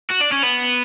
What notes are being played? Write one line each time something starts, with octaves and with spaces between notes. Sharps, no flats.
F#4
D4
C#4
B3